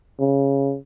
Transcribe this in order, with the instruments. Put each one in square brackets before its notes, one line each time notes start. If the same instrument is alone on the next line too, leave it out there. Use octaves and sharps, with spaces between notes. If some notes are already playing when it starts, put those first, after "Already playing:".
[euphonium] C#3